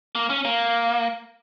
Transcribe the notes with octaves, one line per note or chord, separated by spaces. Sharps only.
A#3
C#4
A#3